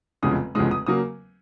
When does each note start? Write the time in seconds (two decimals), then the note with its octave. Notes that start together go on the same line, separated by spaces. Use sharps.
0.22 F1 E2 C#3 F3 G#3 D#6
0.55 F1 E2 C#3 F3 G#3 D#6
0.71 D#6
0.86 C#3 F#3 A#3 D#6